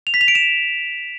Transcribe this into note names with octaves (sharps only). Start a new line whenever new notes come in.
F7
B6
F7
D7
E7